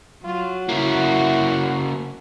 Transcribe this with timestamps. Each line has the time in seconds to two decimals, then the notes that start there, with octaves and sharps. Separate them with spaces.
0.25 F#3 F4
0.69 C#3 A#3 E4 F#4